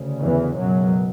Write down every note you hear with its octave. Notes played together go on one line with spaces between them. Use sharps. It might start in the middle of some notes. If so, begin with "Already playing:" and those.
Already playing: D2 C#3
E2 E3
C#2 F#2 B2 F#3